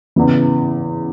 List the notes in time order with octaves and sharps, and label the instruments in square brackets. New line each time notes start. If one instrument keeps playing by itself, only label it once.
[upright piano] E2 C#3 E3